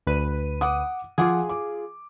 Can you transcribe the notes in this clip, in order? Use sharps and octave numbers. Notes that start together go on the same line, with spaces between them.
D2 B4 D#7
F#5 D6 D#6
F3 F4 G#4 F#5 D6
D6